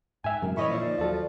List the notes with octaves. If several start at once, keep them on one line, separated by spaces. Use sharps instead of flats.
G#2 E5 G5 G#5
F#2 C3 F#3 G#3 A#4
A2 E3 E4 C#5 D#5 C#6
A#2 F3 D5 E5
D#3 A#3
D#2 F#3 F4 A4